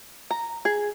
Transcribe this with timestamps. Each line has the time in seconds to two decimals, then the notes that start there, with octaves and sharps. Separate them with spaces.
0.31 A#5
0.65 G#4